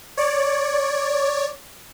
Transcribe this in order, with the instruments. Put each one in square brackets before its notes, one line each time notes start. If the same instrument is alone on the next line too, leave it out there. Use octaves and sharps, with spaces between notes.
[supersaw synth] C#5 D5